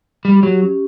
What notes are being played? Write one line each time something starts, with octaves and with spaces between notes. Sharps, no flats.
G3 G4
F#3 G4
C#4